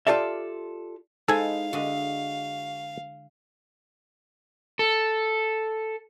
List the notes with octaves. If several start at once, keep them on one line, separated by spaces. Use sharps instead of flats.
F4 G4 A4 D5 E5
G#3 D#4 E4 G#4 A4 C5 F5 G#5
D3 G#3 F#4 D#5 E5
A4